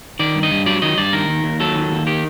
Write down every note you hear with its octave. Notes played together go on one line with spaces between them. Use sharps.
D#3 D5
G2
D#5
G2
F#3 D5
D#3 D#5
G2 D5
D#3 A#4
D#2
D#2
F#3 A4
D#3
D#2
D#3 G4